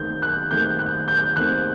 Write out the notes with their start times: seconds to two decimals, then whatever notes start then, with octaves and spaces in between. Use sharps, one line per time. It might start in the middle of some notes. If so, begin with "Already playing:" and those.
Already playing: D#2 D#3 A3 C4 G6
0.22 F#6
0.51 D#2 D#3 A3 C4 G6
0.79 F#6
1.08 G6
1.36 D#2 D#3 A3 C4 F#6